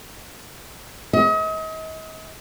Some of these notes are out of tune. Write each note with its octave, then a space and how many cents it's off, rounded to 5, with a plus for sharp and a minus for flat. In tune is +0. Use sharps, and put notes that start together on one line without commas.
D#5 +40